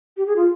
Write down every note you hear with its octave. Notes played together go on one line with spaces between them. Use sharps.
G4
G#4
F4